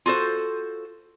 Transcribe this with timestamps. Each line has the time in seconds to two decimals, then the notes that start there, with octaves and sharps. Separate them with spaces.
0.06 F4 F#4 A4 C5